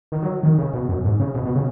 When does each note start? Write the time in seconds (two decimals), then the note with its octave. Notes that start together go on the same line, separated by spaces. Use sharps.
0.12 D#3
0.22 F#3
0.43 D#3
0.58 C#3
0.74 B2
0.89 F#2
1.04 G#2
1.20 C#3
1.35 B2
1.45 B2
1.56 C#3